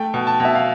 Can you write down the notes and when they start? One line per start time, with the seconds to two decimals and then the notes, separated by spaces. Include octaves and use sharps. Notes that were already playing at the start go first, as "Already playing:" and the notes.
Already playing: A3 G5
0.14 B2
0.27 A5
0.40 B2
0.45 E5
0.55 F5